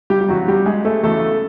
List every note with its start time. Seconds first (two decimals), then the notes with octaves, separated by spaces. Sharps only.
0.10 G3 G4
0.21 G4
0.28 E2 C#3 F#3 F#4
0.48 G3 G4
0.66 G#3 G#4
0.85 A3 A4
1.03 E2 C#3 F#3 A3 A4